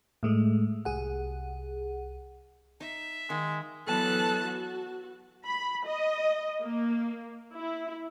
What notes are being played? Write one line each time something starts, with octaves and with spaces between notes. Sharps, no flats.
A2 G#3 A3
C2 G#4 F#5
D#4 E5
D#3 G#3 F5
E3 F#3 B3 A4 A5 F#6
F#4
B5
D#5
A#3
E4